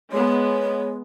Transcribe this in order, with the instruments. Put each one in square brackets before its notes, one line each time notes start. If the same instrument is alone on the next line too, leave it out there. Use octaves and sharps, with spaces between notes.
[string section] G#3 B3 [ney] C#5